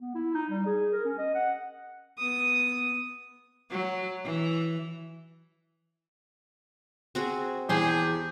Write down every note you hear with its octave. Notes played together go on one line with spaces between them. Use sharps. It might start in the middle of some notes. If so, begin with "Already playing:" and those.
B3
E4
D#4
G3
G#4
A#4
C#4
D#5
F#5
B3 D#6
F#3
E3
C4 F#4 G#4
E2 G4 G#4 G5 A5 C6